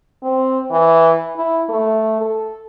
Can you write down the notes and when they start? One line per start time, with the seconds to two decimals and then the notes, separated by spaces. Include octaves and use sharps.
0.23 C4
0.71 E3
1.37 E4
1.69 A3
2.21 A4